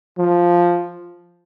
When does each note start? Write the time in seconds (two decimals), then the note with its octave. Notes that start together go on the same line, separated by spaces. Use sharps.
0.18 F3